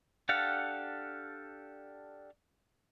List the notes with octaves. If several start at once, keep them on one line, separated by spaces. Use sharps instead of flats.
D4 G4 A4 F5 F#5